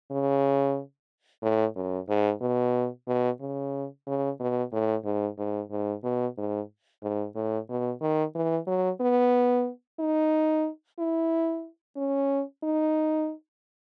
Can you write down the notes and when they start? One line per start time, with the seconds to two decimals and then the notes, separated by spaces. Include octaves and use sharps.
0.11 C#3
1.43 A2
1.76 F#2
2.09 G#2
2.42 B2
3.08 B2
3.40 C#3
4.07 C#3
4.40 B2
4.73 A2
5.05 G#2
5.38 G#2
5.71 G#2
6.04 B2
6.38 G#2
7.03 G#2
7.35 A2
7.69 B2
8.01 D#3
8.35 E3
8.67 F#3
9.01 B3
10.00 D#4
10.99 E4
11.97 C#4
12.63 D#4